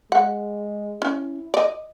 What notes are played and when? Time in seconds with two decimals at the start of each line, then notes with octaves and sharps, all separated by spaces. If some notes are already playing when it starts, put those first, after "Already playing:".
0.12 G#3 F#5
1.02 C#4 E4
1.54 D5 D#5